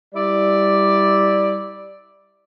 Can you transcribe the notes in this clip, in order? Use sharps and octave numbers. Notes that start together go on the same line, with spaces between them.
G3 E4 D5